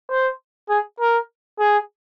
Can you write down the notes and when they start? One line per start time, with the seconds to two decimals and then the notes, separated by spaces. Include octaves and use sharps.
0.10 C5
0.70 G#4
1.00 A#4
1.59 G#4